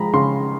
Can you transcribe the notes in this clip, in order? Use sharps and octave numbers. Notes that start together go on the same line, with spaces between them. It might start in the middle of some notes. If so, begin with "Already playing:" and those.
Already playing: F3 G#3 A#5 B5
C#3 C6